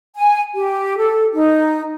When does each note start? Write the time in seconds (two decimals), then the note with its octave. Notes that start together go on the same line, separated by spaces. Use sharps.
0.16 G#5
0.55 G4
0.97 A4
1.35 D#4